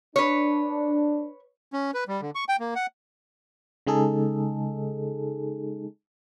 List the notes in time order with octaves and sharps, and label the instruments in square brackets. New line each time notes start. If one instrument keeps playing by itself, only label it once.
[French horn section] D4 [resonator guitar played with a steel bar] B4 C#5
[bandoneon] C#4
B4
G3
D3
C#6
G5
A#3
F#5
[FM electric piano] C#3 G#3 D#4 G#4 A4